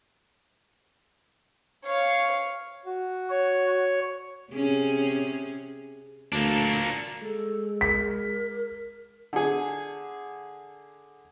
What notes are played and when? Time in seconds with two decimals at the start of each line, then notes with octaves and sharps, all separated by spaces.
1.85 C#5 F5
2.86 F#4
3.30 C#5
4.52 C3 C#4 G#4
6.32 D2 A#3 D4
7.22 G#3 A4
7.81 A#4 B6
9.33 D3 G#4